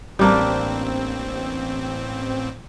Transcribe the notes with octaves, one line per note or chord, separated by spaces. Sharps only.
A1 G3 A#3 C4 D4